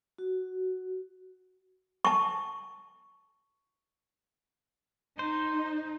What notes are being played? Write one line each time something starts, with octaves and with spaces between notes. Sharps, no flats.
F#4
A5 C#6
D#4 C5